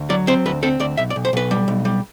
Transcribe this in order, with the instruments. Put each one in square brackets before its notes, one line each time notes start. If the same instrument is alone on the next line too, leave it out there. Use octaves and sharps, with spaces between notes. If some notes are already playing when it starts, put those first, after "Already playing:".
Already playing: [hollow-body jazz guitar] D2
F#3 D5
C4 C5
D2 B4
C4 A4
D2 D5
B1 E5
D5
B1
C5
B1 B4
G3
B1
G3